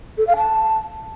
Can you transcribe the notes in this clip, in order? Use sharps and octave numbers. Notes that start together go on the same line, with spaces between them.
A4
F5
A5